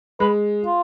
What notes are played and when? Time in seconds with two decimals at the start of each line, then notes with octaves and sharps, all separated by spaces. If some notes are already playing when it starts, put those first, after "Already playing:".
0.20 G#3 B4
0.65 F4